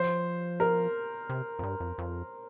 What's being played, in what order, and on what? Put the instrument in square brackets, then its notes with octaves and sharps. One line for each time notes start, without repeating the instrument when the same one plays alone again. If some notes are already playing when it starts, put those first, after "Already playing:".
Already playing: [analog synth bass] F3 [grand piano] C5
[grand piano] A#4
[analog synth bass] C3
F2
G2
F2
F2